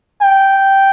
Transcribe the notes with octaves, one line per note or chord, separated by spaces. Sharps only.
G5